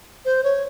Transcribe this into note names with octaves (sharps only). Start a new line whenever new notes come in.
C5
C#5